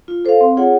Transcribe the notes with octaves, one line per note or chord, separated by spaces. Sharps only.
F4
A4 C5 F5
C4
F4 G#4 C#5 F#5